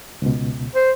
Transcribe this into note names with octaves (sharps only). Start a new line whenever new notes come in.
C#2 B2
C5